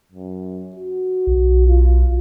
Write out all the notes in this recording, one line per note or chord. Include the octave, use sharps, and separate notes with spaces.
F#2
F#4
B1
F4